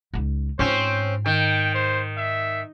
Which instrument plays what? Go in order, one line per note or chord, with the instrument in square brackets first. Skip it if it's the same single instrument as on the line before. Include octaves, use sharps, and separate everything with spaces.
[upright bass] C#2 D#4
[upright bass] G#2 F4 [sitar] C4 C#4 [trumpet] C5
[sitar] D#3 [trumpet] G5
[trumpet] C5
E5